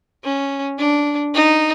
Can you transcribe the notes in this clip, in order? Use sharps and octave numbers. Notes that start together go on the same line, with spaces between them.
C#4
D4
D#4